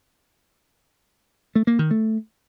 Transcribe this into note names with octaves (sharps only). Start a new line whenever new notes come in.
A3
A#3
D#3
A3